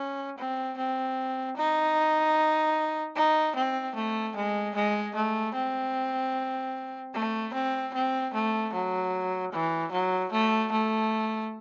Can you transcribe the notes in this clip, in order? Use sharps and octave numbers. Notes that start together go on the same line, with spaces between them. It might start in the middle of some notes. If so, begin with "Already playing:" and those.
Already playing: C#4
C4
C4
D#4
D#4
C4
A3
G#3
G#3
A3
C4
A3
C4
C4
A3
F#3
E3
F#3
A3
A3